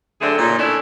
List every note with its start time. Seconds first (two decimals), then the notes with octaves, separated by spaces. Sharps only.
0.21 D3 F#3 A3 C4 D4 G#4
0.39 A#2 C#3 D#4
0.59 A3 C#4 D4 E4